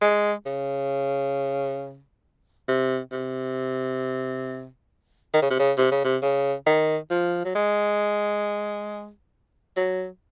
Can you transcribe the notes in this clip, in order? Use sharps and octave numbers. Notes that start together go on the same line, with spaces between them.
G#3
C#3
C3
C3
D#3
C#3
C3
C#3
C3
C#3
C3
C#3
D#3
F3
F#3
G#3
F#3